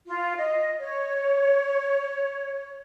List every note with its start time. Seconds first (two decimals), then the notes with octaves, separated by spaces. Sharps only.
0.07 F4
0.36 D#5
0.79 C#5